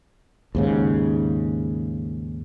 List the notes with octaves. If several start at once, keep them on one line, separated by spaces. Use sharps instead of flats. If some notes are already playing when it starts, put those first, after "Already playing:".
D#2 G#2 C#3